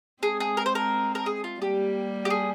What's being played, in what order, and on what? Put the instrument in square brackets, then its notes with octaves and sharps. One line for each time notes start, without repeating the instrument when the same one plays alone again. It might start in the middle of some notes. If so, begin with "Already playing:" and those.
[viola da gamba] G#3 C4 [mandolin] G#4
[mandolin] G#4
A#4
C5
A#4
A#4
G#4
F4
[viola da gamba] G3 A#3 [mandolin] G4
[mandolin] G4
G#4